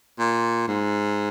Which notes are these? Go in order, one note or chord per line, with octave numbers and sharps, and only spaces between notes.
A#2
G#2